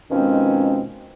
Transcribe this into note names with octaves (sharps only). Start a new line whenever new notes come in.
B2 D#3 F3 G#3 C4 C#4